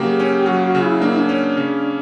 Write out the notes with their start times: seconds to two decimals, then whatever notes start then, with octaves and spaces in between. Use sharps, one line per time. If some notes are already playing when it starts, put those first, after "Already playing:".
Already playing: C#3 F#3 A#3 G4
0.20 C#4
0.46 F#3 F#4
0.64 F#4
0.75 C#3
0.83 E4
1.02 A#3 D4
1.10 E4
1.18 D4
1.29 C#4
1.57 C#3